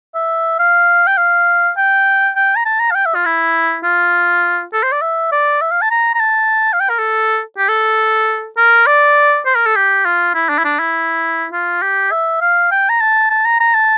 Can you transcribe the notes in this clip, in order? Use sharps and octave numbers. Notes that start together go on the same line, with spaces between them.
E5
F5
G5
F5
G5
G5
A#5
A5
A#5
F5
G5
E5
F4
E4
F4
A4
C5
D5
E5
D5
E5
F5
A5
A#5
A#5
A5
F5
G5
A#4
A4
G4
A4
A#4
D5
C5
A#4
A4
G4
F4
E4
D4
E4
D4
E4
F4
G4
E5
F5
G5
A#5
A5
A5
A#5
A#5
A5